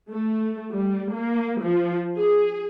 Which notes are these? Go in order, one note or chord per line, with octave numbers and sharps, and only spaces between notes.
A3
G3
A#3
F3
G#4